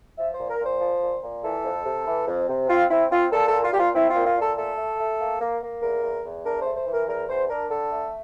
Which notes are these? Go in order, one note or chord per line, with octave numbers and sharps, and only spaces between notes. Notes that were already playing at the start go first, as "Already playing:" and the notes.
F3 E5
C5
A#2
A#4
A#2 C5
F3
A#2
A#2
E3 A4
F2
C3
E3
F2
C3
C4 F4
C4 E4
C4 F4
A#2 A4
A#2 A4
F4
A#2 G4
F4
C4 E4
F4
A#2
F4
A#2 A4
A3 A4
A3
A3
A#3
A#3
A#3
E2 A#4
E2
E2
D4 A#4
A3 C5
C5
E3
A#4
E2 A#4
E2 C5
D4 A#4
D3 A4
A3